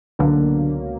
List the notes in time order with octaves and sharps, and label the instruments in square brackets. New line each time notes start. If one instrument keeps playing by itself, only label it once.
[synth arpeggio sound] C#2 B2 F#3 A#3 [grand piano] D3